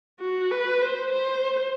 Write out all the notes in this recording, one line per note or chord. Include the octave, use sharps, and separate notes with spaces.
F#4
B4
C5
C5